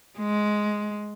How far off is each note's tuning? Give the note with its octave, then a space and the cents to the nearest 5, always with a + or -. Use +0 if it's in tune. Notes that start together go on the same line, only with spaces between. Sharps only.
G#3 +10